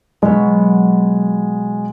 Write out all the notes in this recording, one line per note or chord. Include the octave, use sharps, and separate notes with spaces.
B2 F#3 G#3 B3